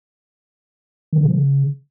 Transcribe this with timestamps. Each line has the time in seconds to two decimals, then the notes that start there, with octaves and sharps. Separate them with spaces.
1.13 D#3
1.18 D3
1.23 A#2
1.28 F3
1.34 C#3